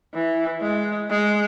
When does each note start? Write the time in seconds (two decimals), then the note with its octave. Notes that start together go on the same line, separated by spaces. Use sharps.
0.14 E3
0.61 G#3
1.10 G#3